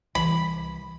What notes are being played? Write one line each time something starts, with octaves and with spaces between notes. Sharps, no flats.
C2 E3 B5